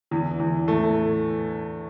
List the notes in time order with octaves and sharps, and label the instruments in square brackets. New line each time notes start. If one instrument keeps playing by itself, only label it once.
[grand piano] E2 E3
E2 E3
A2 A3